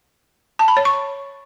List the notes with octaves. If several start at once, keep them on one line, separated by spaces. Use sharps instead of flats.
A5
B5
C#5
C#6